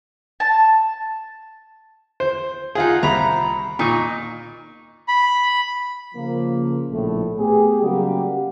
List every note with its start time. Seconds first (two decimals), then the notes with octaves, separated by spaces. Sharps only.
0.40 A5
2.20 C5
2.75 D#4 F4 G#4 F#5
3.03 C2 A#5 B5
3.79 A#2 D#4 C#6
5.08 B5
6.15 C#3 F3 A#3
6.91 A#1 A2 A3
7.38 A3 B3 G4 G#4
7.82 C#3 F#3 G3 A#3 F#4 G4